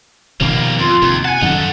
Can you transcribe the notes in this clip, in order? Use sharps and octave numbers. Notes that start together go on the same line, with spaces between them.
B2 D#3 F3 G3 A#3
F2 F4
D#2 C3
F#5 G#5 A5
F#2 D#3 F#3 D#4 A4